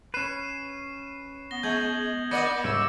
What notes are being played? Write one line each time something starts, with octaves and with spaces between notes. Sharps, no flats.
C#4 B4 C7 D#7 E7
B3 A#6 G7
G#3 B3 G6 G#6 F#7
A#3 D5 D#5 D6 A#6 C#7
G#2 C#3 G3 C#5 E5 E6